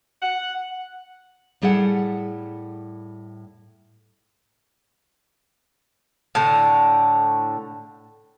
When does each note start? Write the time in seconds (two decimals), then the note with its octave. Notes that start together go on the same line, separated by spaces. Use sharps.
0.22 F#5
1.62 A2 G3 G#4 A4 F#5
6.35 A2 D3